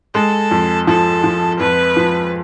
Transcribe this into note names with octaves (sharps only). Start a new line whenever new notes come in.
G#3 A4
F2
F3 A4
F3
F2 B4
F3